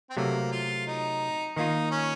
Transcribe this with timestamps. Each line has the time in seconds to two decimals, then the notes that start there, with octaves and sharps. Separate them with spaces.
0.10 C4
0.17 C3 F#3 A3 A#3
0.52 F4
0.87 D#4
1.56 D#3 A#3 D#4 F4
1.91 C#4